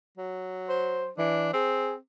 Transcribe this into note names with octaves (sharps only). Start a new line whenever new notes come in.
F#3
C5
E3 D4
C4 G#4